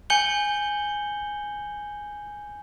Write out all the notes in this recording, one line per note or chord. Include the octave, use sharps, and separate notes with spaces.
G#5 G6 C#7 F#7 G7